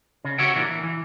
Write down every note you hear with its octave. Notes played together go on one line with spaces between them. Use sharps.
C#3
F#4 G4 C#5 E5 F#5 G5
A#2 E3 A#3 D4
E3
E3